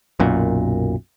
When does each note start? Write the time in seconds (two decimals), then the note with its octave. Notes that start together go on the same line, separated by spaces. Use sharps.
0.20 B1 F#2 A#2